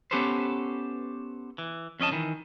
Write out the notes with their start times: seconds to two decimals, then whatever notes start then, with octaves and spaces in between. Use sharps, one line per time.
0.11 B3 C#4 G4 A4 B4 C5
1.58 E3
2.00 F2 C#4 D#5 A5
2.12 D#3 E3